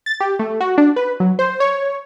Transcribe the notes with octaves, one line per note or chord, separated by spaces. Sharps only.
A6
G4
A3
F#4
D4
B4
F#3
C5
C#5